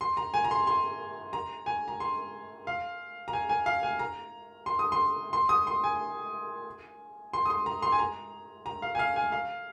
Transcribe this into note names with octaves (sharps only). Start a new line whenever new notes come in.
C6
A#5
G#5
A#5
C6
C6
A#5
G#5
A#5
C6
F5
A#5
G#5
G#5
F5
G#5
A#5
C6
D#6
C6
C6
D#6
C6
G#5
C6
D#6
C6
A#5
C6
G#5
A#5
A#5
F5
G#5
F5
G#5
F5